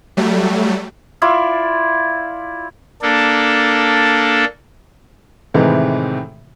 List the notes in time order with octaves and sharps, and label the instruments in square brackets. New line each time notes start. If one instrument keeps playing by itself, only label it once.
[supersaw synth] F#3 G3 A3
[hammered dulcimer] E4 F4 D5
[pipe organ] A#3 D4 A4
[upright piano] A2 C3 D#3 E3 G#3